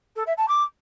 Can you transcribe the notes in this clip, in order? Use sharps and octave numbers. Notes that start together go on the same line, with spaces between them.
A4
E5
A5
D6